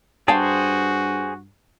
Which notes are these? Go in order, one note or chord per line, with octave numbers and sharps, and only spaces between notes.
G2 F#4 G#4 C5 F5 G5 A5